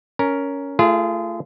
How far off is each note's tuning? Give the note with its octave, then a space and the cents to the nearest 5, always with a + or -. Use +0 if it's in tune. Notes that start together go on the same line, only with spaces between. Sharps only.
C#4 +10 A#4 +0
A3 +15 F4 -30 G#4 +10